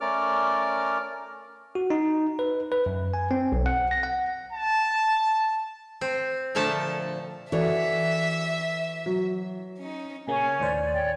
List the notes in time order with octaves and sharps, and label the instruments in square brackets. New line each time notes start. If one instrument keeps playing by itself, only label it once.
[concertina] A3 C#4 A#4 D5 D6 F6
[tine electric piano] F#4
D#4
B4
B4
F#2
G#5
C4
B1
F#5
A#6
F#5
[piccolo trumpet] A5
[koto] C4
A#2 D3 F3 A3 A5
[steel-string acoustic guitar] E3 A#4 C#5 [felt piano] F#4 A4 D5 [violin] E5
[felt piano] F#3
[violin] C#4 D#4
[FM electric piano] A#2 C#3 A#3 [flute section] C#4 C#5 [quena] G#5
[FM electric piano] D#2 A2 C5 [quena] D5
[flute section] C#5 G5